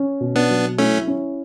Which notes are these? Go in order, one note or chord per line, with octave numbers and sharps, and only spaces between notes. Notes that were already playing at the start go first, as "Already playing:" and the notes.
Already playing: C#4
B2
B3 D4
F#3
A3 C#4 E4
C#4